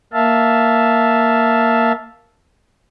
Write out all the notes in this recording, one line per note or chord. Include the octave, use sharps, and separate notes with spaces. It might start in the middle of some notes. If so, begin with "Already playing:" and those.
A#3 E5 F5 A5